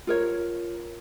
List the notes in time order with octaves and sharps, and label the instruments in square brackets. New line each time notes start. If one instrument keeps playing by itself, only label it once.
[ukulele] F4 A#4 C#5